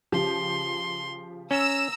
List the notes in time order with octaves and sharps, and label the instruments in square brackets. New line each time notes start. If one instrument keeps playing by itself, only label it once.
[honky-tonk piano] C#3 F3 G4 [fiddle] C6
[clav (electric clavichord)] C#4 [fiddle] A#5 [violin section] E6